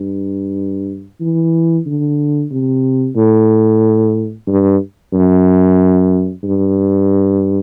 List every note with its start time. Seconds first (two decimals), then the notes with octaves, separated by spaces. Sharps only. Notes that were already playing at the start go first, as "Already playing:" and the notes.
Already playing: G2
1.20 E3
1.86 D3
2.51 C3
3.16 A2
4.47 G2
5.13 F#2
6.43 G2